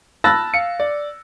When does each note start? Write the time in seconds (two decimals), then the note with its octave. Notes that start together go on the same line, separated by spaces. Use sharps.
0.24 A5 B5 E6 F#6 A6 A#6
0.53 F5 C#7
0.80 D5